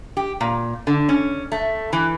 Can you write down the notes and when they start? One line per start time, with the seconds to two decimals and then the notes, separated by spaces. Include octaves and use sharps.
0.17 G4
0.41 A#2
0.87 D3
1.09 C#4
1.52 A3
1.93 E3